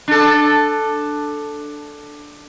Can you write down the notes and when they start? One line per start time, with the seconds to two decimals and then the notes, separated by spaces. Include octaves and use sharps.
0.08 D4 A4